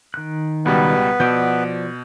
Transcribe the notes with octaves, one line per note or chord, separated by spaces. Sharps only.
D#3 F#6
C#2 B2 G3 B3 B4
B2 F3 D5 E6 G6